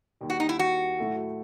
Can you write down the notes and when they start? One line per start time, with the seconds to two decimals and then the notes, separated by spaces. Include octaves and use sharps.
0.21 D#2 D#3 G3
0.30 F#4
0.40 D#4
0.49 E4
0.59 F#4
0.98 A2 F#3 A3 E4 A4